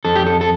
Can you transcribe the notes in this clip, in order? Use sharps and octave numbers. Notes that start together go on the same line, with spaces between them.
F2 A4
G4
A4
A4